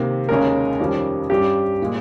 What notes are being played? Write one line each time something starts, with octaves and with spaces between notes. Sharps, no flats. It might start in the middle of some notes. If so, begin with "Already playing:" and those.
Already playing: C3 D#3 A#3
D#2 C#3 G#3 C#4 A#4
F2 D#3 G3 C#4
G2 G3 C#4 G4
A#2 G#3